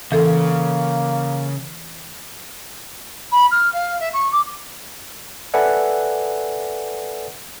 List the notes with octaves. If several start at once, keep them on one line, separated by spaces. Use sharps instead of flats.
C#3 E3 A#3 A4
B5
F6
F5
E5
C#6
D6
A4 B4 D5 E5 F#5 G#5